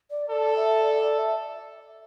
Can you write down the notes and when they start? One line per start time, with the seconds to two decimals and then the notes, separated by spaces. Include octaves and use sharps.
0.10 D5
0.30 A4 D5
0.56 E5
0.83 D5
1.02 D5
1.19 E5